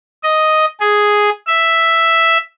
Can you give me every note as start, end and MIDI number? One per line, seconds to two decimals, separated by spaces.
0.23 0.65 75
0.81 1.30 68
1.47 2.38 76